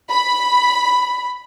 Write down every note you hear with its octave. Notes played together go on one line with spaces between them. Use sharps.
B5